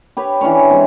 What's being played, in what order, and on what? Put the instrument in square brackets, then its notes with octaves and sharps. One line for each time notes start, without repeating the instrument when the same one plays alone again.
[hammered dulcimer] G4 B4 C#5
E3 C#4 D4 C#5
C3 G#3